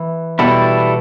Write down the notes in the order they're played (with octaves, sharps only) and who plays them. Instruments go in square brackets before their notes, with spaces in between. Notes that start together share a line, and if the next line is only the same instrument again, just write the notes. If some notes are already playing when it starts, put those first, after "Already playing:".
Already playing: [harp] E3
[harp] B2 [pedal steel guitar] G3 E4 A4